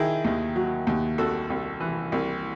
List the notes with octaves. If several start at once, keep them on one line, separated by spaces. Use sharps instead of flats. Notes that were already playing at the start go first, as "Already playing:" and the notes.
Already playing: D#3 E4 G#4
D#2
F#3
D#2
C2 F#4 A4
C2
E3
C2